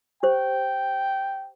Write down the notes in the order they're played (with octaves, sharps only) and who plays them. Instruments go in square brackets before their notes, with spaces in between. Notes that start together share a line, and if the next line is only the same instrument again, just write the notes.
[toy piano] G4 C5 [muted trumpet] G5